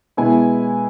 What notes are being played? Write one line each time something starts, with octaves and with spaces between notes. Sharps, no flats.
B2 G#3 B3 E4 G#5